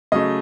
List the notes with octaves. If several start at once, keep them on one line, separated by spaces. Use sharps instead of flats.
C#3 F#3 A3 D#5